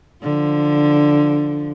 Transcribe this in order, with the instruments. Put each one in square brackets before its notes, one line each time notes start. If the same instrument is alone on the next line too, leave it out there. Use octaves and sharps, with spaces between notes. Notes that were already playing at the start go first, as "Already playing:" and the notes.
[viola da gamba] D3 F3